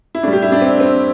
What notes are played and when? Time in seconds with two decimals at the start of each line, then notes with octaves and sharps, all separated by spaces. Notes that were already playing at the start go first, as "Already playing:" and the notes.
0.15 E4
0.23 A2 G3 D4
0.33 G4
0.42 E4
0.52 D4
0.61 C4
0.80 C4